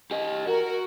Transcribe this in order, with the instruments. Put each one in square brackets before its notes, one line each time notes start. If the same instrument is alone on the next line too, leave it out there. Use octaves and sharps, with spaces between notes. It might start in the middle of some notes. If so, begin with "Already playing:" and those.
[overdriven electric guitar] G4 D#5
[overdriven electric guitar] F#4 [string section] A#4